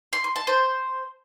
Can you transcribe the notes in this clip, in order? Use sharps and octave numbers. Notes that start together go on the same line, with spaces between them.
C6
C6
A5
C5